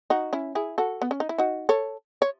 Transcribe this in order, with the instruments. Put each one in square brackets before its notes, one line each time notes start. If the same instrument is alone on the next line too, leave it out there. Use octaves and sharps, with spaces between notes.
[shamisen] D#4 F#4
C#4 E4
E4 G#4
F#4 A4
B3
C#4
D#4
E4
D#4 F#4
A4 C#5
C#5